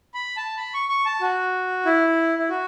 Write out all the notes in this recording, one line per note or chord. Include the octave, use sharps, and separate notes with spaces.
B5
A5
B5
C#6
C#6
A5
F#4
E4
E4
F#4